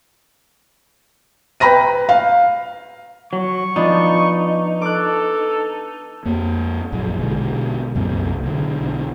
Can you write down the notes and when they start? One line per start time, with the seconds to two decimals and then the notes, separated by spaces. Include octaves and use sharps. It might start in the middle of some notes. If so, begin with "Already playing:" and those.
1.60 B4 G5 A#5 B5 A#6 D#7
2.09 F5
3.33 F#3 C#6
3.76 F3 B3 D4 D#4
4.82 A4 D6 F#6
6.25 F2 A#3
6.92 A#1 F#2 F#3
7.19 B2 D3 G#3
7.95 C2 F#2 A#2 C4
8.43 B1 D3